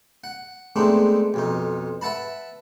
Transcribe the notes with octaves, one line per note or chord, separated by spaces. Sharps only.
F#5
G#3 A3 B3 C4 D4 D#4
B1 F2 D#4
B4 E5 F#5 A5 B5